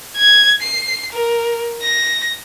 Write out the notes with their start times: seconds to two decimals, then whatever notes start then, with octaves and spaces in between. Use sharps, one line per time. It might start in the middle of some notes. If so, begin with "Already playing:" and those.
0.17 G#6
0.62 C7
1.13 A#4
1.82 A#6